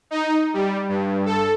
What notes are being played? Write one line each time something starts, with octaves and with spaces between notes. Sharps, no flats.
D#4
G3
G2
A4